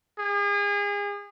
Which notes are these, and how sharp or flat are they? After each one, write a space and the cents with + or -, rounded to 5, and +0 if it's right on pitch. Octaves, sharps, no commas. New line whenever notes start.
G#4 -35